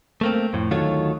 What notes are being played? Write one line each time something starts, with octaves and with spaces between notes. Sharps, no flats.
A3 A#3 C4
F2 A2
D2 D#3 F#3 F4 A4 C#5